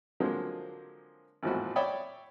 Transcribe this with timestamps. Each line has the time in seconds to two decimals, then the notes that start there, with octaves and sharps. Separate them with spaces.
0.20 D3 F3 F#3 G#3 A#3 C4
1.43 G#1 E2 A2 F3 F#4
1.76 C#5 D5 E5 G5 B5 D#6